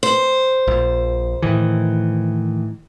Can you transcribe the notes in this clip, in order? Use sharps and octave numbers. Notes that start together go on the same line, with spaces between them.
C5
A#1
A2 D#3 E3